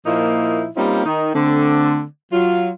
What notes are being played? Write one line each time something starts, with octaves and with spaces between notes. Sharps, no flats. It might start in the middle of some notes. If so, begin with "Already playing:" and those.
A#2 F3 A#3 D#4 E4
G3 A#3 C4 C#4 D#4 F4
D#3 D#4
D3 A3 C4
F#3 F4